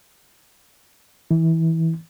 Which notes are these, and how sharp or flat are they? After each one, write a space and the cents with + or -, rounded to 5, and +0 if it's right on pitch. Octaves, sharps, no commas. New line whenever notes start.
E3 -20